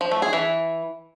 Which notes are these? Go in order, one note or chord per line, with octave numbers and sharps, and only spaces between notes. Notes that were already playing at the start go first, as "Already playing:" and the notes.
F3
A3
G#4
E3